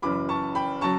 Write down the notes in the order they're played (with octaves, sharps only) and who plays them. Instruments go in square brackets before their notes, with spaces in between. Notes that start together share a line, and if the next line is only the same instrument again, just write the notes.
[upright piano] F#1 F#2 E3 B5 D6
A5 C#6
G5 B5
C#3 F#3 A5 C#6